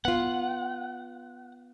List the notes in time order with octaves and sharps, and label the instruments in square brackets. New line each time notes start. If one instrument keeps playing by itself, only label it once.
[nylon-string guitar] B3 F4 [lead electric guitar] F#5